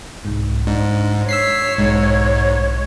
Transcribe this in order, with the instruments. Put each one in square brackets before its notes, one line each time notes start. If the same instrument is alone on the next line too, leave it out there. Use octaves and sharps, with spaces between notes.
[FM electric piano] C2 G#2
[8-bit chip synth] G#2 [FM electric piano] D4
[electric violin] C#5 [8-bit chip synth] E6 B6 C7
[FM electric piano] B1 G#3 [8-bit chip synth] G#2